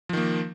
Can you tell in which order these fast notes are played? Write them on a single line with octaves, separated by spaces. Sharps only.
F3 D#3 A#3